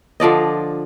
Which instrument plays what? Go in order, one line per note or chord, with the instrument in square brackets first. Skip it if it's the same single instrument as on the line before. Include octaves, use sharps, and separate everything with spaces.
[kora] D3 F3 D5 D#5